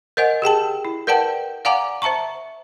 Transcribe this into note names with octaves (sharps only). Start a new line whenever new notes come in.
A#4 C5 D#5 F#5 G#5
G4 G#4 G5 A5
E4
A#4 B4 D5 F#5 G5 A5
D5 F5 F#5 G#5 A#5 D6
C5 E5 A5 A#5 C#6